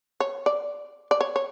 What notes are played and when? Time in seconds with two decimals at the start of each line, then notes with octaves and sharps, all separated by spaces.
0.20 C#5
0.46 D5
1.11 D5
1.21 C#5
1.36 C#5